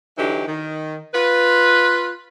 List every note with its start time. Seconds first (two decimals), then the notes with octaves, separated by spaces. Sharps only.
0.18 D3 E3 F#3 D#4 G4
0.47 D#3
1.14 F4 B4